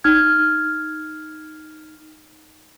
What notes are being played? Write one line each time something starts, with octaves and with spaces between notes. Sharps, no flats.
D#4 F6 G#6